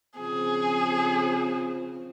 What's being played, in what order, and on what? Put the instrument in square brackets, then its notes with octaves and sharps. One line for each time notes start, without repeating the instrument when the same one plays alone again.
[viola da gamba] C#3 F3 C4 [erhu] G#4